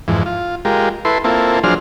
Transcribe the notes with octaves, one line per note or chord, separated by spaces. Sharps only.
F2 G#2 E3
F4
G#3 F4 G4 A#4
E4 A4 B4 C6
A#3 C4 E4 F4 A4
F3 F#3 D4 G#4 C5 F6